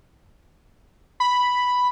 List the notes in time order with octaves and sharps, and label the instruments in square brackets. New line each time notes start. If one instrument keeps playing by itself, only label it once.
[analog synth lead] B5